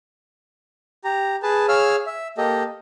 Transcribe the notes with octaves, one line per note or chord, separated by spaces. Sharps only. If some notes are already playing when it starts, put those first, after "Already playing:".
G4 A#5
G#4 B4 A5
G#4 C#5 F5 E6 F6
E5
A#3 G4 A4 D#5